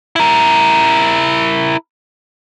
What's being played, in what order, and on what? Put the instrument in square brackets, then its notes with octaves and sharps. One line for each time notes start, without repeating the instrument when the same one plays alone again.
[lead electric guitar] E4 A#4